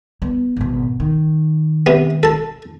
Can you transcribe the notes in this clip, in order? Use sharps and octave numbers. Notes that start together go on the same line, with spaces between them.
B3
G#1 B2
D#3
C3 B3
A4 A5